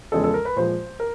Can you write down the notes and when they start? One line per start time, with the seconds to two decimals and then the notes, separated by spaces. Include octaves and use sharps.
0.12 E2 C#3 F3 G#3 A4
0.24 A4
0.34 A#4
0.45 B4
0.56 A#2 F3 G#3 C5
1.00 A#4